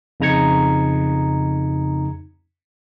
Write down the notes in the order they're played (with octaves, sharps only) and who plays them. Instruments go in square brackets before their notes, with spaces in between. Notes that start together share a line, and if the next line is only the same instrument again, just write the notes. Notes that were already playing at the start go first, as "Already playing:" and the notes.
[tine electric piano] F2 C#3 D#4 A#5 G#6 C#7